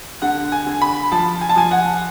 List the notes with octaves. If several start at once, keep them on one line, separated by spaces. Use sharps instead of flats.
D3 F#5
G#5
D3
B5
F3 A5
G#5
A5
F3 G#5
F#5